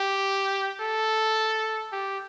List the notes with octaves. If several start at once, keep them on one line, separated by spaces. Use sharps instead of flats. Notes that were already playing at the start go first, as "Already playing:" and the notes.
Already playing: G4
A4
G4